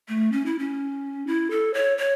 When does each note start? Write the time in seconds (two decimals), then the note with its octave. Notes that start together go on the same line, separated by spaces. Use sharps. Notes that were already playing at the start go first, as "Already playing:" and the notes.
0.09 A3
0.32 C#4
0.46 E4
0.59 C#4
1.27 E4
1.51 A4
1.74 C#5
1.98 C#5